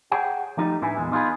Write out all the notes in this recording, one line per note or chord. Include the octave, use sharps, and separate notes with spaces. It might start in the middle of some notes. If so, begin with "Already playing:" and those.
G#4 C#5 F#5 G5
F3 G3 A3 D#4
A2 D4 E4 B4 G#5
E2 A#2 G#3
B3 D#4 F4 F#4 G#4 B4